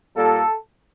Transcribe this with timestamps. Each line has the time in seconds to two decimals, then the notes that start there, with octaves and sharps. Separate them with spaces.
0.15 A#2 G3 A#3 A4